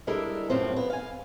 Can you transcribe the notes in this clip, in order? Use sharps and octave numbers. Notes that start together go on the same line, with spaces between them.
G3 G#3 D4 E4 A4 A#4
F#2 A2 F3 C4
B3
F5 G#5